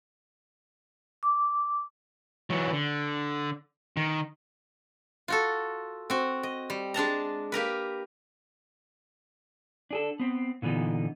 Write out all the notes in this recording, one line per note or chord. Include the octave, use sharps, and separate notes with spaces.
D6
E3 F#3
D3
D#3
F4 F#4 A4
C4 F#4
D#5
G3
G#3 D4 A5 A#5
A#3 G4 A#4 B4
D4 G#4 A4
B3 C4
A#2 D3 E3 B3 D#4